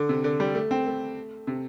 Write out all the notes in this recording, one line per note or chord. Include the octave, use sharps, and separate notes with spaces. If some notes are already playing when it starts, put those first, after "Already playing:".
Already playing: D3
C3
D3
G3
A3
C4
A3
C3